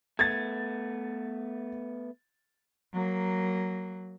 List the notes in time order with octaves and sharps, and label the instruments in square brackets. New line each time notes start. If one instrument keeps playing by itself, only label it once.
[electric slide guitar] A3 B3 [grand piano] G#6 A6
[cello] F#3 A#3